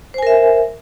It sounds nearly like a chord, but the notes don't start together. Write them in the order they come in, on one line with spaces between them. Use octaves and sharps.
C5 G#5 A#4 E5